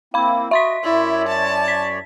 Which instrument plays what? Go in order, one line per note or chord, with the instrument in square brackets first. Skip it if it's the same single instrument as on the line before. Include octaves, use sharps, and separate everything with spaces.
[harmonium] A#3 C4 E4 [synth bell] F5 B5
[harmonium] F#4 D#5 [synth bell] E5 C6 B6
[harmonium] F#2 C#5 D5 [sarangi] E4
[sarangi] A5
[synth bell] B6